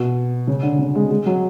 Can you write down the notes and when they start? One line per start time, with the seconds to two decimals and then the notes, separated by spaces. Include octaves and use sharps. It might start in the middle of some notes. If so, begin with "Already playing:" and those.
Already playing: B2
0.47 C#3
0.63 D3
0.78 C#3
0.95 G#3
1.10 G#3
1.26 F#3